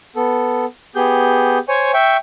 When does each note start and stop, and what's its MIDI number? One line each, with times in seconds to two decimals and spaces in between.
0.16 0.65 59
0.16 0.65 69
0.96 1.59 59
0.96 1.59 67
0.96 1.59 68
0.96 1.59 91
1.69 1.92 72
1.69 1.92 73
1.69 1.92 80
1.69 1.92 85
1.94 2.17 76
1.94 2.17 79
1.94 2.17 85